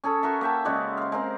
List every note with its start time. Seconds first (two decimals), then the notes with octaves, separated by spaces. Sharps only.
0.04 C#4 G#4 A4
0.23 F#4 A#4 E5
0.41 A#3 E5 G5 A5
0.65 C#3 G#3 F#4 D5
0.97 C5 F5
1.12 G#3 C4 A#4